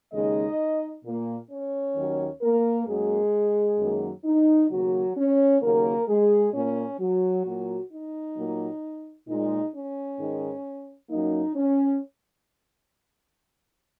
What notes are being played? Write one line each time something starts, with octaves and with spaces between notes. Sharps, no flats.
D#2 C#3 G#3 D#4 D#5
A#2 A#3
C#4 C#5
D#2 D#3 F#3 A#3
A#3 A#4
F#2 F#3 G#3 A#3 G#4
F#2 D#3 F#3 A#3
D#4
D#2 C#3 F#3 A#3 F#4
C#4 C#5
D#2 C#3 F#3 A#3 A#4
G#3 G#4
A#2 A#3 C#4
F#3 F#4
A#2 F#3 A#3
D#4
A#2 F#3 A#3
A#2 G#3 D#4
C#4
G#2 D#3 G#3
F#2 F#3 A#3 D#4
C#4